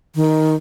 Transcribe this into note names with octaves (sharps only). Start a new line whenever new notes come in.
D#3